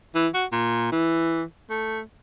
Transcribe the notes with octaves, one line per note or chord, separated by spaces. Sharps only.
E3
F#4
A#2
E3
A3